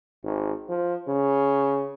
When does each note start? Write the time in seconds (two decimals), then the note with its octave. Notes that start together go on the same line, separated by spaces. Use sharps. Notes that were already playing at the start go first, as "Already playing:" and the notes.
0.24 G#1
0.69 F3
1.08 C#3